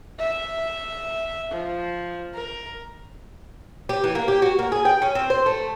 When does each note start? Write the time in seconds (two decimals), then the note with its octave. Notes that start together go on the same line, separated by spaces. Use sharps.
0.19 E5
1.52 F3
2.34 A#4
3.89 G4
4.04 E3
4.15 A#3
4.28 G4
4.42 F#4
4.59 A#3
4.72 G#4
4.85 G5
5.02 C#4
5.15 C4
5.30 C5
5.46 A3